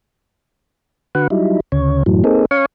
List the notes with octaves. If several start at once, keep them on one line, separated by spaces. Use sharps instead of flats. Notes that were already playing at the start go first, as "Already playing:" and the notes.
D3 F#4 B4 F#5
F#3 G3 D#4 E4
D2 C#3 C#5
F#2 A2 E3 F#3
A#3 C4 D#4 G#4 A4
C#4 C#5 F5 G#5 C#6